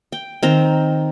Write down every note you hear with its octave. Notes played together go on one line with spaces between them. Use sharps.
G5
D#3 C4 A#5